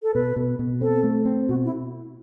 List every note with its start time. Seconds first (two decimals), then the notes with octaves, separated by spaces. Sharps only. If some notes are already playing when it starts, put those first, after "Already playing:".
0.03 A4
0.14 B2 B4
0.36 B2
0.59 B2
0.81 C4 A4
1.03 A3
1.25 C4
1.48 B2 F#4
1.65 E4